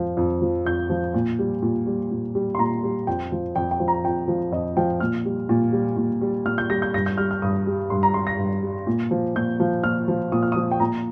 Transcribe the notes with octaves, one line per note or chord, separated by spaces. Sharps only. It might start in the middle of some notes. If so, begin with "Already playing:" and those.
Already playing: F2 F3
F2
F3
F2 G6
F3
A#2
G3
A#2
G3
A#2
G3
C6
A#2 A#5
G3
F2 G5
F3
F2 G5
G5
F3
A#5
F2 G5
F3
F2 D#5
F3 G5
A#2 F6
G3
A#2
G3
A#2
G3
A#2 F6
G6
G3 A#6
G6
G2 A#6
G6
G3 F6
F6
G2 D#6
G3
G2 C6
A#5
G3 C6
A#6
G2
G3
A#2
F3
A#2 G6
F3
A#2 F6
F3
A#2 D#6
F6
F3 D#6
G5
A#2 A#5